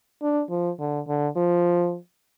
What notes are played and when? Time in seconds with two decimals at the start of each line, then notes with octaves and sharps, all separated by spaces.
0.22 D4
0.50 F3
0.80 D3
1.08 D3
1.36 F3